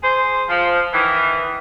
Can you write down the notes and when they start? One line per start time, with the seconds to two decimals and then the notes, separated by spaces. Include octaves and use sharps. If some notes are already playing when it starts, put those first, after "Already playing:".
0.03 G#4 C5
0.49 F3
0.93 D#3 E3